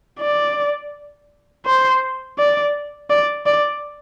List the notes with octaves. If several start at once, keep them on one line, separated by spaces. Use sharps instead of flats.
D5
C5
D5
D5
D5